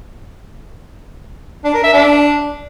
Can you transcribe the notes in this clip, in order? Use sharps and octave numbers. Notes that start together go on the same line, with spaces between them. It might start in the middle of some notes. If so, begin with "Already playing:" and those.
D4
A#4
E5
D4